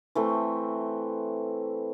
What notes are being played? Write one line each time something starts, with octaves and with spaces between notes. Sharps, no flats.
E3 A3 C4